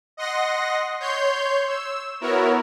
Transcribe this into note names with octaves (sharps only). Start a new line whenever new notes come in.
D#5 F#5 C6 A#6
C#5 C6 G6
E6
B3 E4 F#4 A#4 C#5